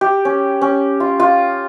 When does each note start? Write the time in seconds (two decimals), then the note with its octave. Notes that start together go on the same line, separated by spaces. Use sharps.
0.01 G4
0.25 C#4
0.61 C#4
1.00 F4
1.20 F4